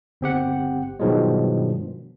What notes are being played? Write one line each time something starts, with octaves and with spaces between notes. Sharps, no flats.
G1 C4 G4 F#5
G2 B2 D#3 F3 F#3 G#3